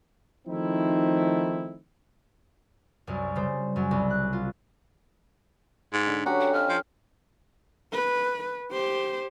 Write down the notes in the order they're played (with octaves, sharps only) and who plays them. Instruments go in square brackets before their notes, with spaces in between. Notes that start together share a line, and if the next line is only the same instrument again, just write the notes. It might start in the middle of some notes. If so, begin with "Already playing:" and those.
[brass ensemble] D#3 F3 A3 C4 D#4 E4
[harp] C2 F#2
C#3 G3 C5
F#2 F#3
C2
F#6
F4
[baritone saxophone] G#2
[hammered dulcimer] D3
[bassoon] F#3 [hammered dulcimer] C#4 G4 B4 [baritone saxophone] F#4
[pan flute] F#5
[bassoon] F2 [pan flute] F6
[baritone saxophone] F3
[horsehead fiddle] B4
G4 C5